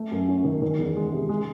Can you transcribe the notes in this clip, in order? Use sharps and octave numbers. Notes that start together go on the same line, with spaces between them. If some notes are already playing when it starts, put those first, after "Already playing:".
Already playing: A3
F#2
C#4
D#3
D#3
E2
G#3
C3
G#3